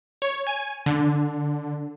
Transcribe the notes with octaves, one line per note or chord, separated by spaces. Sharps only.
C#5
G#5
D3